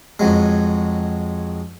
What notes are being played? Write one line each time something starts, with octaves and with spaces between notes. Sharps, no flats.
F2 F#3 G#3